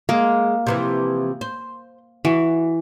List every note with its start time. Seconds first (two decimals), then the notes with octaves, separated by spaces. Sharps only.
0.09 G#3 A#3
0.67 C3 E3 F3
1.41 C5
2.25 E3 F#4